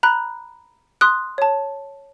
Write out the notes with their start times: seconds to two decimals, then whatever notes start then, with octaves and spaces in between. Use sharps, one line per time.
0.03 A#5 B5 F#6
1.01 C6 D#6 F#6
1.38 C#5 A5